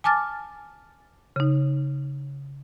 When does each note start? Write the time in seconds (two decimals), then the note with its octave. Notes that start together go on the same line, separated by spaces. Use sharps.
0.04 G#5 A5 D6 F6 A6
1.36 C#3 D#4